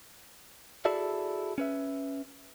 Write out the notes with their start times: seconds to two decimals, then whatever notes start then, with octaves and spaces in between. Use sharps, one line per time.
0.85 E4 F#4 G#4 A4 D5 E5
1.58 C#4 B4 E5